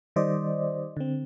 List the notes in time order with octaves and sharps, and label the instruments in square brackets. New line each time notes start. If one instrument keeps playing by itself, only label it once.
[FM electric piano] D#3 G3 C5 D5 D#5
D3 C4